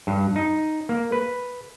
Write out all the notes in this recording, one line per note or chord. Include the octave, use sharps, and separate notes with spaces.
G2
D#4
A#3
B4